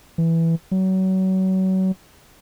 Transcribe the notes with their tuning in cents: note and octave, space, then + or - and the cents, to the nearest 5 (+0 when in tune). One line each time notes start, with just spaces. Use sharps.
E3 +0
F#3 +30